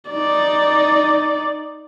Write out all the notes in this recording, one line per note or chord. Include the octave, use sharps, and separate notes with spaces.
D#4 D5